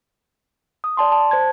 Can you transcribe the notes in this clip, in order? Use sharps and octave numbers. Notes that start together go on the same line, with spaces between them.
D#6
D5 A5 C6
A5
C5 A5 G#6